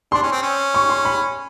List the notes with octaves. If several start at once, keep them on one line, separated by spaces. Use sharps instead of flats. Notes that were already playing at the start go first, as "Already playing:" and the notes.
D4 C6
C#4
C4
C#4
C#6
C6
B5